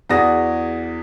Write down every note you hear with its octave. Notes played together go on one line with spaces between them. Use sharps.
E2 F#4 G#4 D5 D#6 A#6